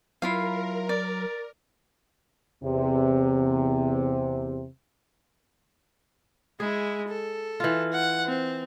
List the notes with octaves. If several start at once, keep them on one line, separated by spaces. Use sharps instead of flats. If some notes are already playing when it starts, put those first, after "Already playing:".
F#3 E4 F4 A#4 F5
D5
E2 C3
G#3 E4 G#4
A4
E3 F4
F#5
C4